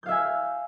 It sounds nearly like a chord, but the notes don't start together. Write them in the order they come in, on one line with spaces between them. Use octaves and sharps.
G6 F5 E5 G#5 E6